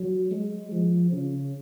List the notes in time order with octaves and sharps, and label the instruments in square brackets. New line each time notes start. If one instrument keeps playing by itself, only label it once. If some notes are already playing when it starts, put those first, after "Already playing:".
Already playing: [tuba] F#3
G#3
F3
C#3